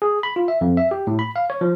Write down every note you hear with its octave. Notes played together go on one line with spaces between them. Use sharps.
G#4
B5
F4
E5
F2
E5
G4
A2
B5
F5
C#5
F3